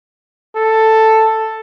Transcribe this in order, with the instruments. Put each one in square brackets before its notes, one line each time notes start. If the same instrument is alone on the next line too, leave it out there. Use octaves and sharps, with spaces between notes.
[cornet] A4